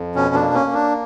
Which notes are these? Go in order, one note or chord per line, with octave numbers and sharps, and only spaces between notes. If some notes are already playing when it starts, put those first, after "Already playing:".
Already playing: F2
B2 C#4
D4
A#3
C#4
A#3
D4